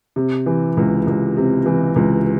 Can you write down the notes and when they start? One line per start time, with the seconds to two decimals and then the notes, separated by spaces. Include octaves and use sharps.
0.16 C3
0.46 E3
0.77 C#2
1.07 C#2
1.37 C3
1.66 E3
1.96 C#2